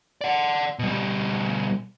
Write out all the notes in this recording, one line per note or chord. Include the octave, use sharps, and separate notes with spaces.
D5 F#5
B2 G3